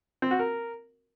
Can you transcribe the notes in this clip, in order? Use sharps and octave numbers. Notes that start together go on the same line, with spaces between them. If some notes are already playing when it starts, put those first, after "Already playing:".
C4
F#4
A#4